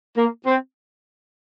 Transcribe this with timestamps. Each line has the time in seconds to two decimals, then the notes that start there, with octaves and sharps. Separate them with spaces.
0.17 A#3
0.46 C4